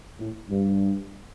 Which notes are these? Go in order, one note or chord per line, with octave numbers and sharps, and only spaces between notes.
A2
G2